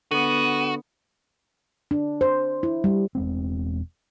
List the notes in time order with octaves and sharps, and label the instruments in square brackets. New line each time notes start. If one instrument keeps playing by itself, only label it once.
[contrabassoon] D3 [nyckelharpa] B3 [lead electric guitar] F#4 [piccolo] D#7
[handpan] D4
C5
E4
G3
[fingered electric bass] E1 G#3 C4